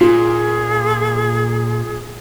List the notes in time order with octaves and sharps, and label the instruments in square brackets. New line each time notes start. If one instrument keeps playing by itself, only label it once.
[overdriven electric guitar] A#2 [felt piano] F4 [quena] G#4